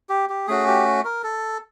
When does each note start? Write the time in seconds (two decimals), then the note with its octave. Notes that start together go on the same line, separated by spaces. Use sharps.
0.09 G4
0.29 G4
0.47 A3 C#4 F#4 G#4
0.67 G4
1.05 A#4
1.23 A4